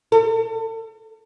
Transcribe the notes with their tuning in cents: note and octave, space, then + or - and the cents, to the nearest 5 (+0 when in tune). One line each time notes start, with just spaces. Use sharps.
A4 +35